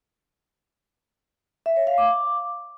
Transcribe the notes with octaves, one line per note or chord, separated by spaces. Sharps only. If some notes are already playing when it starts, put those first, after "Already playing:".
E5
C#5
F5
D6